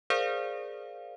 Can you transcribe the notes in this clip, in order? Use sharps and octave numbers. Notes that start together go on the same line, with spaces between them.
G#4 A#4 C5 D5 F5